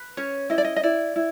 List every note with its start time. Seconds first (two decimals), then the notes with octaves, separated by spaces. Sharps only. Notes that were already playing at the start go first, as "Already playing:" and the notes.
Already playing: B4
0.17 C#4 C#5
0.50 E4 D#5
0.58 D5
0.65 D#5
0.76 D#5
0.83 E4 D5
1.16 E4